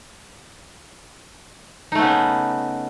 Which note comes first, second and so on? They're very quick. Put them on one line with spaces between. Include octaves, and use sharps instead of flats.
D#4 A3 B3 C#3